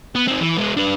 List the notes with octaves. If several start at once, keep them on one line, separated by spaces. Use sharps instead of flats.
B3
C4 D#4
E3
G#3 B3
D4 B4